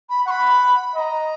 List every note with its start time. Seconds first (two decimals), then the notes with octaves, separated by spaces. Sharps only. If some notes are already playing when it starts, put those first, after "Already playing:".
0.10 B5
0.26 F#5 C#6
0.31 B5
0.95 D#5 B5
0.99 A#5